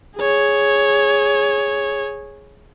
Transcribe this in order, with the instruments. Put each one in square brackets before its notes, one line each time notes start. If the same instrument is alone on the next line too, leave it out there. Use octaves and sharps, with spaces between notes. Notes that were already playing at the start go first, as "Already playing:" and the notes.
[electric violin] G#4 C#5